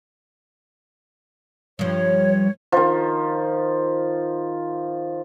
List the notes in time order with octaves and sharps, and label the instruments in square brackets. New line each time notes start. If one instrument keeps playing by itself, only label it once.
[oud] G2 F3 [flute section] C#5
[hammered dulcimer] D#3 F3